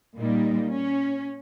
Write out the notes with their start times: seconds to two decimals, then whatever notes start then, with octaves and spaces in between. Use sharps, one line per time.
0.18 A#2 G3 A#3 D#4
0.71 C#4